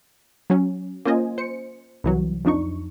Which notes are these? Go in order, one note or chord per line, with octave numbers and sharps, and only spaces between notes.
F#3 C#4
A#3 C#4 F4 C5 D#5 G#5
C5 C#7
C2 E3 F#3
F2 F3 D4 D#4 C#6